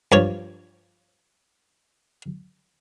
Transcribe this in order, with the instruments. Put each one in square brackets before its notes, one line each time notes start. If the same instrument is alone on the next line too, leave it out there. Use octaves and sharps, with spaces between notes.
[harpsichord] G2 F3 C#5